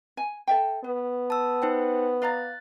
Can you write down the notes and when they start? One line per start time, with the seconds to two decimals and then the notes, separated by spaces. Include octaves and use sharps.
0.17 G#5
0.47 A4 E5 G5
0.84 B3 B4
1.30 A5 E6
1.62 D#4 C5 G5
2.22 D5 F5 A#5 F#6 A6